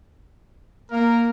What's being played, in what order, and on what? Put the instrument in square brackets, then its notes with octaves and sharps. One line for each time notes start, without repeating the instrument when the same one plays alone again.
[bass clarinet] A#3 [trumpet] A#4